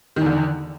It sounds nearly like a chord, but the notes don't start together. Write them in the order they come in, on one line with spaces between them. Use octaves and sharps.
D#3 E2 D3